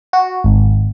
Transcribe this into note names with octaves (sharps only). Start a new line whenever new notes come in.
F#4
G#1